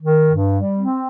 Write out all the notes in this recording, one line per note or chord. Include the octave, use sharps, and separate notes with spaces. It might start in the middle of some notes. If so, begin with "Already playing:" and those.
D#3
G2
G3
C4